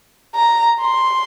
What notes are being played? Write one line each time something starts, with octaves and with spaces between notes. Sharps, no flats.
A#5
C6